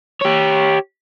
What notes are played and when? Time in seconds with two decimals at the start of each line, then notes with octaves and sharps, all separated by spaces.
0.22 G4 C#5